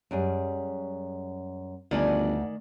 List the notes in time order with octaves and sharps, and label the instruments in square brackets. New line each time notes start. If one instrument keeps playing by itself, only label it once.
[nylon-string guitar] F#2 G3 G#4
[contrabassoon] G1 [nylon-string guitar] D2 [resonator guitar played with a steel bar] D#3 D5 G#5